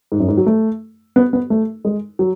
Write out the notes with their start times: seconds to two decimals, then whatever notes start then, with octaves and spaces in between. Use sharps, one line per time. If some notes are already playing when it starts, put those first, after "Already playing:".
0.12 G#2
0.20 F#2
0.28 G#2
0.37 F#3
0.46 A3
1.16 B3
1.33 B3
1.50 A3
1.85 G#3
2.19 F#3